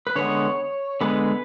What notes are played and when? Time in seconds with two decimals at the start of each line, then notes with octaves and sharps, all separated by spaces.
0.07 B4
0.16 D3 G#3 B3 C#5
1.01 D3 G#3 B3 B4